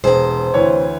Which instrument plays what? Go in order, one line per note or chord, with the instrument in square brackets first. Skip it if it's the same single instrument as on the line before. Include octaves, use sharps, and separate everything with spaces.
[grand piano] E1 G#4 [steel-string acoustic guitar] C3 C5
[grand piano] D2 E3 C#5